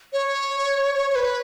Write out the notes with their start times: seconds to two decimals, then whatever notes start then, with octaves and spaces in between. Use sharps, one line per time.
0.13 C#5
0.95 C#5
1.10 C#5
1.15 B4